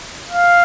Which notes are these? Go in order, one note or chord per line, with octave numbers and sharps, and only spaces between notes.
F5